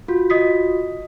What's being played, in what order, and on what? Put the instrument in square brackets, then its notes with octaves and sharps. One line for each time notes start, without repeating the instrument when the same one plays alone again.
[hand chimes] F4 F#4
[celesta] D#5 D#6 B6